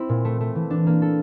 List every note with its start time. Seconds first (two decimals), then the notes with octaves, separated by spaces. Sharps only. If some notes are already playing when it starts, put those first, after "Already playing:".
Already playing: C4 E4
0.09 A#2
0.25 A3
0.41 A3
0.55 E3
0.70 D4
0.87 A#3
1.02 A4